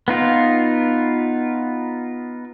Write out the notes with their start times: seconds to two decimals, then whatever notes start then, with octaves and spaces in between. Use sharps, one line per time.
0.08 B3 D#4 F4